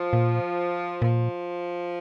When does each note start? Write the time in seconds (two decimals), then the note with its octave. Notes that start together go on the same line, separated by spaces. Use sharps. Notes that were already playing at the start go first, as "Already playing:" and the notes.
Already playing: F3
0.13 A#2
1.02 A#2 F3